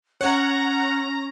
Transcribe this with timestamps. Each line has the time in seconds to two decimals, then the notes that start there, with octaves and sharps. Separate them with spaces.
0.21 C#4 C#5 F#5 A#5